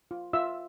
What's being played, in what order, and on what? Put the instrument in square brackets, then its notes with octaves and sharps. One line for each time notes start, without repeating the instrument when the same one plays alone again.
[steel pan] F4
F4 E5 E6